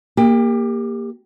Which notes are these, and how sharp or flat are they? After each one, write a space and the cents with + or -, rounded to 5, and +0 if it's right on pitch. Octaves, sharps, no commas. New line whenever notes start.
A#3 +0 G4 +25